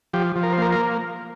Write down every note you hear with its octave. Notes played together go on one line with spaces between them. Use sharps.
F3 G4
F3
A#4
C5
A#3 A#4
A#4